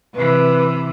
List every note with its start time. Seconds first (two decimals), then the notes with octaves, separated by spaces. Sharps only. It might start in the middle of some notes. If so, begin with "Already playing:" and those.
0.14 C3 E3 B4